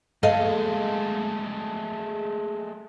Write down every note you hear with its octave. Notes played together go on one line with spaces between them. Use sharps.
G#3 A3 A4 D#5 F5